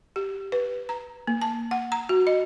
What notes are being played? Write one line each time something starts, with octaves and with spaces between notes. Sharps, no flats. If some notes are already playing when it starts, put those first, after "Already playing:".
G4
B4
A#5
A#3
A5
F#5
A#5
F#4
D#5